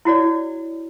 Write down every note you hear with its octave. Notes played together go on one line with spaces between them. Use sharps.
E4 F#4 C#5 D5